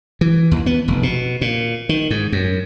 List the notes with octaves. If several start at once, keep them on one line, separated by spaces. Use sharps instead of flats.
E3
D#2
B3
F1
B2
A#2
D#3
G#2
F#2